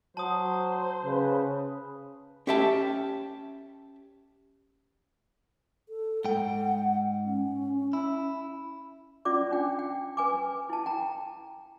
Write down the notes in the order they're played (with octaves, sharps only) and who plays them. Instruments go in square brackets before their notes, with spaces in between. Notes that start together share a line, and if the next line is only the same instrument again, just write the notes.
[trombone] F#3 [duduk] C5 [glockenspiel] A5 D#6
[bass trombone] C#3 [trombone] B4
[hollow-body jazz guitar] C#4 G4 E5 G5 A5
[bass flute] A4
[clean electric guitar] G#2 G5 [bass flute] F#5
[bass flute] C#4
[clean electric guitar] E4
[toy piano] C#4 F4 D5 D6
C#4 D4 G5
G5
B4 G#5 D6
E4 A5
G5 A#5